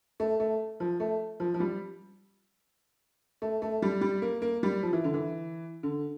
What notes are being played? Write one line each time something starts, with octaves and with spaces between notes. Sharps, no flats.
A3
A3
F3
A3
F3
F3
G3
A3
A3
G3
G3
A#3
A#3
G3
F3
E3
D3
E3
D3